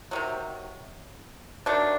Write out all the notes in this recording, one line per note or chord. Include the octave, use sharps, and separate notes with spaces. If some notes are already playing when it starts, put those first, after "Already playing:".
C3 D#3 F#3
D#3 F#3 A3 D4